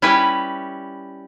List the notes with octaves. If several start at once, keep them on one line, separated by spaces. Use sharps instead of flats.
G3 C#4 E4 G4 B4